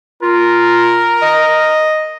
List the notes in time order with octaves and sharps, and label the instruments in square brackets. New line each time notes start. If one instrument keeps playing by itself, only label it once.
[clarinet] F4 [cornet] A#4
[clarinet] D#5